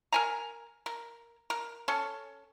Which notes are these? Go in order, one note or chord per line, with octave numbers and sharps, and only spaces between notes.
A#4 G#5 A#5
A#4
A#4
C#4 A4